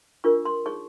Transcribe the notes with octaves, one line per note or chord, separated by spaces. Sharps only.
D4 F4 A#4 C#6
C6
D#4 G#4 C#5 C#6